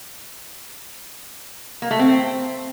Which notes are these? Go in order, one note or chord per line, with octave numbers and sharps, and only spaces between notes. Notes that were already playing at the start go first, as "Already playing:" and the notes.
A#3
A3
C4